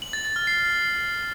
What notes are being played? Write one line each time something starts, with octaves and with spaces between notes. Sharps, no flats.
F#7
A6
A6
F6
C7